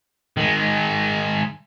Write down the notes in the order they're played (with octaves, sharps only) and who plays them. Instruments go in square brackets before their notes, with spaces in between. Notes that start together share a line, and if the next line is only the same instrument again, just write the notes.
[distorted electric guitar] D#3 G#3